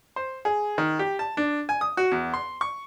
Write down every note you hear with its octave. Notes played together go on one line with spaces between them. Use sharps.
C5
G#4
D#3
G4
A5
D4
G#5
D#6
F#4
E2
C6
C#6